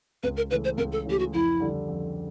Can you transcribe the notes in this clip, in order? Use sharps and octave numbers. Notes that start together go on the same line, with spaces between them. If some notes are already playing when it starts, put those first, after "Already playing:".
C#2 B4
A#4
C#3 E3 A3 B4
C5
C#2 A#4
A4
C#3 E3 A3 G4
F#4
F2 E4
D3 G3
F2